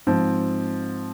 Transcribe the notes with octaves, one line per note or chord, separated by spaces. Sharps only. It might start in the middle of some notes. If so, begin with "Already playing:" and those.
G#2 F3 C4